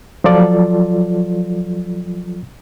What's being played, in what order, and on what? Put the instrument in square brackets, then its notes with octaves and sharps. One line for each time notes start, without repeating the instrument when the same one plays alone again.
[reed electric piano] F3 F#3 F4 A4 D5